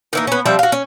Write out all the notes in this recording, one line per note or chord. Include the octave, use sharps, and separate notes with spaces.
D#3 E3 A#3
B3 C#4
F3 G3 C4 E5
F#4 F5
C#4